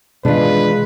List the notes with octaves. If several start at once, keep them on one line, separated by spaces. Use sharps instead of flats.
B2 D#3 E3 G#3 D4 F4 B4